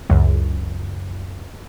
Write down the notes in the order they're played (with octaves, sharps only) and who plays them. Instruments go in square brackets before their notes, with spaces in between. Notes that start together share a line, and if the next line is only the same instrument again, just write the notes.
[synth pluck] C#2 F#2